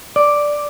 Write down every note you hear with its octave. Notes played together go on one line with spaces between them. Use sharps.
D5